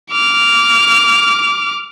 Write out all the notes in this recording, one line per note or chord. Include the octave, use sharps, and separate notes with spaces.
D6 F6